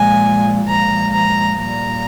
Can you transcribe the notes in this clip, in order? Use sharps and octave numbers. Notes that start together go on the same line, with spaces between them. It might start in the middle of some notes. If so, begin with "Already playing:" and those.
Already playing: A#2 F3 G#3 G#5
A#2 F3 G#3 A#5
A#5
A#2 G3 A#5